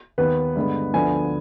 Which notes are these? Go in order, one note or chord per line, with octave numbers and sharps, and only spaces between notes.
D#2 D#3 B3 B4
G2 D3 G#3 B3
D2 D3 F3 B3 G#5